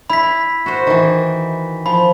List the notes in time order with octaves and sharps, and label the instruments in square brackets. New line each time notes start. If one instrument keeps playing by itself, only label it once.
[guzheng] E4 [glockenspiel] B5 B6
[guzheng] F#4 C5
D#3 E3
[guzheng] F3 [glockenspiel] B5